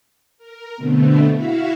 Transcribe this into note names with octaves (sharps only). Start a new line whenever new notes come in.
A#4
B2 D3 A3 B3 C4
E4 F#4 E5 F5